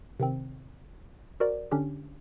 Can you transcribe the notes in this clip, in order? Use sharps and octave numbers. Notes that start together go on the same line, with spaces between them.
C3 D#3 C4
F#4 A#4 C5 D5
D3 C#4 D4 G4